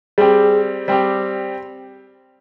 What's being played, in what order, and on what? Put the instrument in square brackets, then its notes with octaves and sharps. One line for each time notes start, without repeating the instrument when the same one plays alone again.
[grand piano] G3 C4 G4 [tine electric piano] G#4
[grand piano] G3 C4 G4